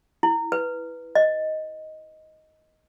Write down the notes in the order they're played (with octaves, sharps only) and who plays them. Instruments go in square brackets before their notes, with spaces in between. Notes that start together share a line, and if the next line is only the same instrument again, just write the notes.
[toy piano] E4
B4
D#5